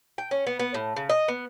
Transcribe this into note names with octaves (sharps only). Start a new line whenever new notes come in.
G5
C#4
B3
B3
A2
C#3
D#5
B3